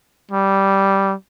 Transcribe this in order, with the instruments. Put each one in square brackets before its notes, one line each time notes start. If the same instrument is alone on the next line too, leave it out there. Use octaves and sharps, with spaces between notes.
[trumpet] G3